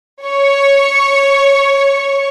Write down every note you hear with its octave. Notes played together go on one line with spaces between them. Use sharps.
C#5 C#6